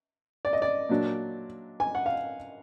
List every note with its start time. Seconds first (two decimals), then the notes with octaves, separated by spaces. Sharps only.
0.45 D5
0.53 D#5
0.62 D5
0.89 A#2 F#3 D4
1.80 G#5
1.95 F#5
2.06 F5